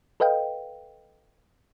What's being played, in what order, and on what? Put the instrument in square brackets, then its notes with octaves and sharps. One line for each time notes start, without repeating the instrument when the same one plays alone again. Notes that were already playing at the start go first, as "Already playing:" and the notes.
[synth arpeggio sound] A4 B4 D#5 F5 G5